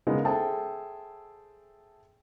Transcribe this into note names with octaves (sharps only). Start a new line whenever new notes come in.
C#3 G#3 B3 D#4 A#4
G#4 A4 C5 E5 G5 A5